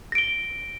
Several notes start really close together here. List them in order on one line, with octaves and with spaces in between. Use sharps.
A#6 D7 G7